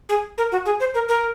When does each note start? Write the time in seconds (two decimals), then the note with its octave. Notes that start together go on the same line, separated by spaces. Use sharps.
0.09 G#4
0.38 A#4
0.52 F#4
0.66 G#4
0.80 C5
0.94 A#4
1.09 A#4